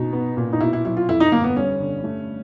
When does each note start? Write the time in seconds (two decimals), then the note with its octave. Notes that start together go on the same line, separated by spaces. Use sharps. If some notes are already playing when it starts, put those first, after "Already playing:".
Already playing: B2 D#4
0.13 B3
0.37 A#2
0.53 D#4
0.60 B2 E4
0.73 E4
0.85 F#3 E4
0.97 F4
1.08 F2 E4
1.20 D#4
1.32 G1 A#3
1.44 B3
1.56 G2 C#4
1.81 D3
2.04 A3